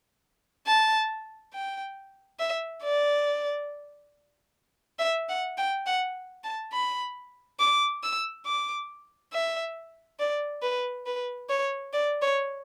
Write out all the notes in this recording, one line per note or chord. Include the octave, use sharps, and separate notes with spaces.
A5
G5
E5
D5
E5
F#5
G5
F#5
A5
B5
D6
E6
D6
E5
D5
B4
B4
C#5
D5
C#5